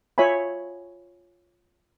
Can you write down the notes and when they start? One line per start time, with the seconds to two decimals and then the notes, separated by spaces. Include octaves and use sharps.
0.18 F4 C#5 E5 G#5 B5